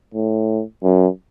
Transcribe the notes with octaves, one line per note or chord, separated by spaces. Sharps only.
A2
F#2